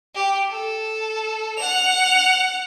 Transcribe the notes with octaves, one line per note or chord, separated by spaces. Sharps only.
G4
A4
F#5 F7